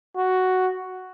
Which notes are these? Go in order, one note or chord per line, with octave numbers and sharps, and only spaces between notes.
F#4